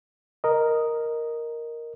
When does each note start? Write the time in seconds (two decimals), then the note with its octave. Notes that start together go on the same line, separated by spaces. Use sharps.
0.44 A#4 D#5